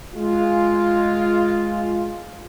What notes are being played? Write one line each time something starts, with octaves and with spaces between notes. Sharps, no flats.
G#3 F4